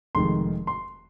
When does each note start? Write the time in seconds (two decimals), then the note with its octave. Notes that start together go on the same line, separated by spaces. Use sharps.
0.15 F1 F2 D#3 G#3 C6
0.67 C6